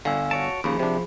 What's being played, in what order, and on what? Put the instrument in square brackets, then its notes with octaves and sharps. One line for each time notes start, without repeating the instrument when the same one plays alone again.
[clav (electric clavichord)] G1 D3 [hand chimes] F5 G#5 E6
[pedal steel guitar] F#4 C#5 A5 [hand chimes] D7
[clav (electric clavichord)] D#2 C#3 [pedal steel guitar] F3 [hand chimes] G#4 B5
[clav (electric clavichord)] C3 D4